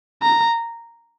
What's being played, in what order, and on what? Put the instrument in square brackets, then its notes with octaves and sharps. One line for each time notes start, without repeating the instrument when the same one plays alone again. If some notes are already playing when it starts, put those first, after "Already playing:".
[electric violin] A#5